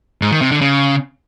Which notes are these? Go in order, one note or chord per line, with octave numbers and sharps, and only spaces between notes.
G#2
D#3
C3
D3
C#3